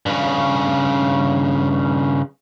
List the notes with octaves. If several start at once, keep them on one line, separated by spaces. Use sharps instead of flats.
G2 C#3